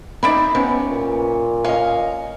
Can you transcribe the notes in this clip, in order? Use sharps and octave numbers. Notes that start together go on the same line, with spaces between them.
C4 C#4 D#4 D5 E5 B5
C3 B3 C#4
A#2
C#4 D#5 F5